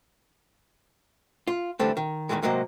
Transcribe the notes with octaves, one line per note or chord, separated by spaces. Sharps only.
F4
D3 E3 G3 A3 C4
D#3
E2 A2 D#3 E3 G#3
G#2 C3 F#3 A#3 D#5